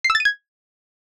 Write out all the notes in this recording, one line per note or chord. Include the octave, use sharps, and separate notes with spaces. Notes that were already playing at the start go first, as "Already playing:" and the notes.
C7
E6
A6
D#7
G#6